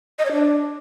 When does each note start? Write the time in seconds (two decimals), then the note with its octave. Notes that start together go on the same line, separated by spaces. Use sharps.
0.19 D#5
0.25 C#5
0.32 D4